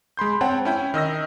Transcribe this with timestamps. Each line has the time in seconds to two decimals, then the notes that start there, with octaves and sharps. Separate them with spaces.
0.17 G#3 B5 C6 G6
0.41 C4 C#5 F#5 G5 A5
0.65 C#4 E4 G5
0.94 D#3 D#5 E6 A#6